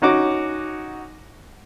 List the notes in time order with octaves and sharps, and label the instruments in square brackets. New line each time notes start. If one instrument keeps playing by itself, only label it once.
[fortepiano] C#4 D#4 F#4 D6